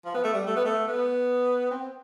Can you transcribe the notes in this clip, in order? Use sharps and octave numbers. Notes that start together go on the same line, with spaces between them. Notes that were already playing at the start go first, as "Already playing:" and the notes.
F3
B3
A3
G3
A3
B3
A3
B3
C4